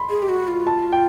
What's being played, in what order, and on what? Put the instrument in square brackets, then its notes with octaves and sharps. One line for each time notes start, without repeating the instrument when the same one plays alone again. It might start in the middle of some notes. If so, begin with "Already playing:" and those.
Already playing: [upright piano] B5 C6
[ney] G#4
G4
F#4
F4
[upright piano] A5
G5